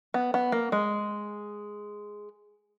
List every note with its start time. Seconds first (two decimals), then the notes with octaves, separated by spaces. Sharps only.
0.14 B3
0.34 B3
0.52 A#3
0.72 G#3